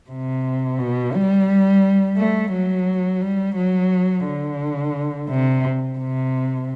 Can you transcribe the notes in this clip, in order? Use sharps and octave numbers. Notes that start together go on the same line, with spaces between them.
C3
B2
G3
A3
F#3
G3
F#3
D3
C3
C3